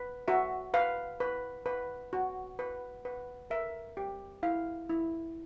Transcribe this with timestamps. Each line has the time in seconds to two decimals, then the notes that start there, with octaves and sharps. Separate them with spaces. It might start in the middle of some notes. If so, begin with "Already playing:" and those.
Already playing: B4
0.28 F#4 E5
0.74 B4 F5
1.20 B4
1.66 B4
2.13 F#4
2.59 B4
3.05 B4
3.50 A#4 E5
3.97 G4
4.43 E4 F5
4.89 E4